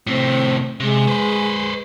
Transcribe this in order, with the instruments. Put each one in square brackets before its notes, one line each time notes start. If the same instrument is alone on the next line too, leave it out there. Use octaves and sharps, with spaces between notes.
[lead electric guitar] A2 C3 [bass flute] C4
[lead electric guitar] C3 [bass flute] G#3
[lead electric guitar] B4 C5